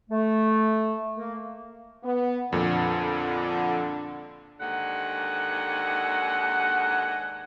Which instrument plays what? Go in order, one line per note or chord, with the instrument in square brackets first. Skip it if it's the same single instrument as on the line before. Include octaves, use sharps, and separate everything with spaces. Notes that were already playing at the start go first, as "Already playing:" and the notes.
[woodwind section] A3
A#3
[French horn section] B3
[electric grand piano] F2 A#2 [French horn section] D3
[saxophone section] D#2 G#2 D3 F#5